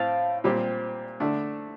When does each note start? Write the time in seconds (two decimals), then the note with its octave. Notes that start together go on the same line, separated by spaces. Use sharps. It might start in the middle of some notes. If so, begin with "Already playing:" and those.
Already playing: A2 C4 F5 A5
0.44 A#2 G3 C4 G4
1.20 D3 A3 D4